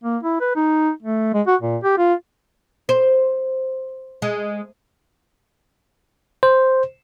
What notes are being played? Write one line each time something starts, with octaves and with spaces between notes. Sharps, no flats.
A#3
E4
B4
D#4
A3
G#3
F#4
A#2
G4
F4
C5
G#3
C5